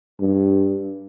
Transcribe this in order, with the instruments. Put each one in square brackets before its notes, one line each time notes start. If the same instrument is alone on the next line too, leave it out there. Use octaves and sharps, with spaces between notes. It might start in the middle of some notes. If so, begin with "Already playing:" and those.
[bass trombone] G2